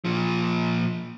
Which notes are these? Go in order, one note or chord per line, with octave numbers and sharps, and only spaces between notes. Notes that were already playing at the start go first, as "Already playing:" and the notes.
A#2 F3